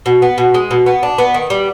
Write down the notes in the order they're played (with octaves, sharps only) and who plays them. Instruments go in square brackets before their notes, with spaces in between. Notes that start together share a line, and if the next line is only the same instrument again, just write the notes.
[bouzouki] B2
B3
B2
G#3
B2
B3
D4
B3
D#3
G3